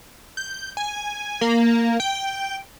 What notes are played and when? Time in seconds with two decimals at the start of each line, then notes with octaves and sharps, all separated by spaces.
0.37 G6
0.77 G#5
1.41 A#3
2.00 G5